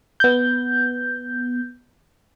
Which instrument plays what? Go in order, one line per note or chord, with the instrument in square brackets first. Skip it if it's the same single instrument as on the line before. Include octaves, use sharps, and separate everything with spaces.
[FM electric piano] B3 G6